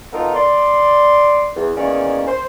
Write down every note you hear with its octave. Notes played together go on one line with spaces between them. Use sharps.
B3 D#4 F4 A4 A#4
D5 C6
E2
E2 D#3 A#3 C#4 C#5 D5
C5